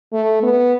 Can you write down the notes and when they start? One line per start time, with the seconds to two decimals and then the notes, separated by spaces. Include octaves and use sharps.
0.13 A3
0.43 B3